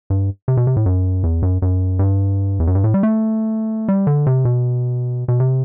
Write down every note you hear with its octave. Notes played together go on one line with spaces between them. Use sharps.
G2
C3
B2
C3
A2
F#2
E2
F#2
F#2
G2
E2
F#2
G2
A2
G3
A3
G3
D3
C3
B2
B2
C3